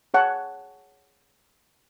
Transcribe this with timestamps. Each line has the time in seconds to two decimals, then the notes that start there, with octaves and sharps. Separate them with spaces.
0.14 G#4 C#5 F#5 A5